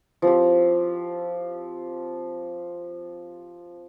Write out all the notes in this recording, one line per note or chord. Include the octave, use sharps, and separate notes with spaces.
F3 C4 G4